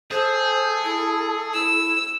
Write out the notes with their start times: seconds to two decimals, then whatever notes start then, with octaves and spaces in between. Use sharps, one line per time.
0.11 G#4 A4 C5
0.84 E4
1.54 E4 E6